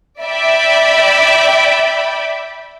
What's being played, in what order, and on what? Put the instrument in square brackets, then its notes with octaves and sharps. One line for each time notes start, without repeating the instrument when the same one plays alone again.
[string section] D5 E5 G5 B5